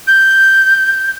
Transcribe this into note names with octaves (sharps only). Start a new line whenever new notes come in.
G6